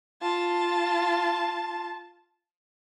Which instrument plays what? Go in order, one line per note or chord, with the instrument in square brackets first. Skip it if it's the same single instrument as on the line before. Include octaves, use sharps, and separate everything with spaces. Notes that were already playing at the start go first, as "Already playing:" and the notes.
[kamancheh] F4 A5